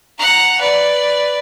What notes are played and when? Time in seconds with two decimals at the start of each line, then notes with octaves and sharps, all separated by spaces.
0.18 F#5 A#5
0.60 B4 D5